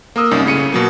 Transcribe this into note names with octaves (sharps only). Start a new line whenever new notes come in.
A#3 A#4 D#6 E6
C2 F#2 C#4 D#4
A2 C#3 C#7 D#7
B2 F#3 A#3